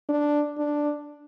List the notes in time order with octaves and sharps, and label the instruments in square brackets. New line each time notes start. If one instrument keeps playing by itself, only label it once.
[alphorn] D4
D4